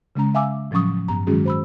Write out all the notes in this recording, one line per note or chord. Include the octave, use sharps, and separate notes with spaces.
C#3 G#3 C#4 A#5
E5 F5 G#5 D6 E6
A2 F3 F#3 C#4 C#6 D#6
G2 B3 A#5
D#3 F#3 G#3 C#4 F#4 G#4
C5 B5 E6